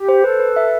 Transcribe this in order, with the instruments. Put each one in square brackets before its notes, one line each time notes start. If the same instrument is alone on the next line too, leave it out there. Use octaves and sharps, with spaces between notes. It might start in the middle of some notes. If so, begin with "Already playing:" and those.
Already playing: [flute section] G4
[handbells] C5
[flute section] A4 [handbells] B4
[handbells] B4
E5